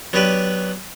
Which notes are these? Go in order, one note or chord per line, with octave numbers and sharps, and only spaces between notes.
F#3 B3 D4 G4 B4